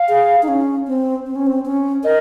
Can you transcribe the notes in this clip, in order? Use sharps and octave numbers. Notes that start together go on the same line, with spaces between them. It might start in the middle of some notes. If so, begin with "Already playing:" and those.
Already playing: F5
G#4
D#4
C#4
C4
C4
C#4
C4
C#4
A#4 D#5